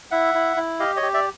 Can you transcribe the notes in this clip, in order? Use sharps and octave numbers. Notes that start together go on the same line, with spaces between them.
E4 E5 F#5
E4
E4
G4 D#5 F5
C#5 D#5
G4
D5 E5